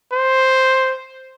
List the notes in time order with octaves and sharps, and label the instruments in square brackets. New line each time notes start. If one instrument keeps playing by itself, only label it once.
[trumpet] C5